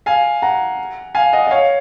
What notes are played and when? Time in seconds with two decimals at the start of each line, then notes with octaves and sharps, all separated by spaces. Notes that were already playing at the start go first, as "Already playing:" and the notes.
0.06 F5 G#5
0.42 F#5 A#5
1.15 F5 G#5
1.32 D#5 F#5
1.47 D#5
1.51 C#5 F5